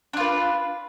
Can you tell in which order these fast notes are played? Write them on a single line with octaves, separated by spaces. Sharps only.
D4 F4 B4